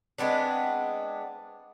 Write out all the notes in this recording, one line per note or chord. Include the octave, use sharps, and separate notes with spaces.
G#3 B3 C4 D4